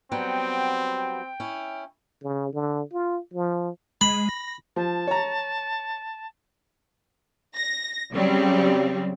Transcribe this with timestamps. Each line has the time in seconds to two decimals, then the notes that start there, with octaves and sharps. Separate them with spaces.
0.12 F#3 G3 B3 C4 G5
0.98 G5
1.40 C#4 E4
2.23 C#3
2.53 D3
2.93 F4
3.34 F3
4.01 G#3 B5
4.29 A#6
4.76 F3 A5
5.07 C#5 A#5
7.56 A#6
8.12 C#3 F#3 G3 C4